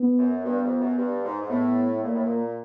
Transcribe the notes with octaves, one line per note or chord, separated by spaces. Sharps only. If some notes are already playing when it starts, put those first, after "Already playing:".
Already playing: B3
F#2
G2 B3
F2
F#2
G2
G#2
G#2
A2 B3
A#2 A#3
A2
A#2